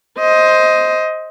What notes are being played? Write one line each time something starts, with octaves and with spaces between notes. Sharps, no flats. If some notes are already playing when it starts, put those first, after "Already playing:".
C5 D#5